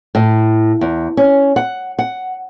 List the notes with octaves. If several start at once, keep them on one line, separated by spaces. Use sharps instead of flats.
A2
E2
C#4
F#5
F#5